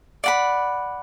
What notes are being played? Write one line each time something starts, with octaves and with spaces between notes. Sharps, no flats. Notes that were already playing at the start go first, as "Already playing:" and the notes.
D5 F#5 B5